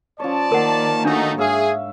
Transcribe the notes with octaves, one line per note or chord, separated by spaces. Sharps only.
F3 C#4 C#5 D5 A5
D#3 A#3 A#4 F#5
A3 D4 D#4 F#4
G#2 G#4 C#5 E5 F5